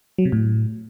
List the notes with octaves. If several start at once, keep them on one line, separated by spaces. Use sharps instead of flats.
F#3
C3
A2